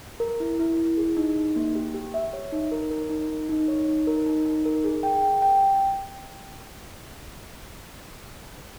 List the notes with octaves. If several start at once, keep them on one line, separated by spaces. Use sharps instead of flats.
A#4
E4
E4
E4
G#4
D#4
D#4
A#3
G4
G4
E5
C#5
D#4
A#4
A#4
D#4
D#4
D#4
C#5
D#4
A#4
D#4
D#4
A#4
G#4
G5
G5
G5